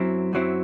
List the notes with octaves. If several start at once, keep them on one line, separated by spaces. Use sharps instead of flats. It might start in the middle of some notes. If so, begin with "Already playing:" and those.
Already playing: F#2 F#3 C4 E4
F#2 F#3 C4 E4